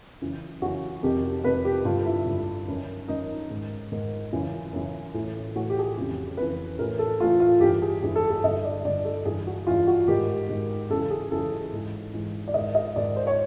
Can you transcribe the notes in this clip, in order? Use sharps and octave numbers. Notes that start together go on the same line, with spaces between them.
F#2 C#3 E3
F#2 C#3 E3 F#4
F2 C3 D#3 G4
F2 C3 D#3 B4
G4
G2 D3 F4
E4
G2 D3
F#2 D#3
F#2 D#3 D#4
G#2 D#3
G#2 D#3
F#2 C#3 E3
F#2 C#3 E3
A2 E3
A2 E3 F#4
G4
G#4
G4
F2 C#3 E3
F2 C#3 E3 B4
A2 E3 A#4
A4
A2 E3 F4
F4
G2 E3 G4
G#4
G2 E3 G#4
A4
A4
G2 D3 D#5
D5
G2 D3 D5
A4
G2 E3 G#4
F#4
G2 E3 F4
F#4
G#2 D#3 G4
G#2 D#3
F#2 C#3 E3 A4
G#4
F#2 C#3 E3 A4
G#2 E3
G#2 E3
D5
G#2 D#3 D#5
D#5
G#2 D#3 D5
C5
C#5